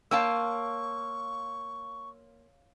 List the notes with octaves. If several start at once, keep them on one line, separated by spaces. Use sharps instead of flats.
A#3 C#5 F5 G5 A5 C6 C#6 E6